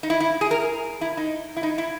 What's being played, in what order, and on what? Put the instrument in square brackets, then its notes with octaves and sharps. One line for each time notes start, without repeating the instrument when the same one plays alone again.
[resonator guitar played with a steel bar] D#4
E4
E4
G#4
A#4
E4
D#4
E4
D#4
E4